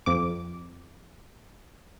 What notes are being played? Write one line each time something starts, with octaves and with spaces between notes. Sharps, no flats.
F2 D6